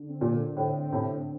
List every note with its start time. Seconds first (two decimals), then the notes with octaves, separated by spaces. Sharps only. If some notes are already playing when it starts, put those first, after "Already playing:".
Already playing: D3
0.09 C4
0.21 A#2
0.33 D3
0.57 A2 C4
0.80 C4
0.92 A2 C3
1.04 C4